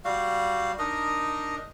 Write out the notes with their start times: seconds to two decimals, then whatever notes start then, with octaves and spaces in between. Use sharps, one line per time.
0.05 G3 F#4 F5
0.79 D4 D#4 A#4 D#5